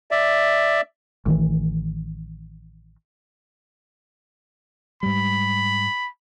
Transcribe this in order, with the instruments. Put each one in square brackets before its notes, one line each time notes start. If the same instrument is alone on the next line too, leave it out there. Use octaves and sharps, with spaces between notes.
[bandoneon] D5 E5
[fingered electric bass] A1 D#3 E3
[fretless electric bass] G#2 G3 [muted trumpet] B5